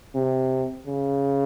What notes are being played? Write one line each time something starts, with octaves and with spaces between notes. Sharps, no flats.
C3
C#3